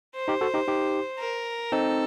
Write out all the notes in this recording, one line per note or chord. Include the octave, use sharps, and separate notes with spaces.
C5
D#4 G4
F#4 A4
D#4 G4
D#4 G4
A#4
C4 D#4 A4